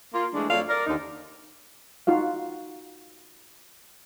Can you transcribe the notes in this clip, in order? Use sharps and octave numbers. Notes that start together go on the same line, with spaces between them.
A#3 F4
E3 G#3 A3 D4
F2 F#3 A3 A4 D5 F5
A#4 D5
D#2 D3 D#4
D#4 F4 F#4 F5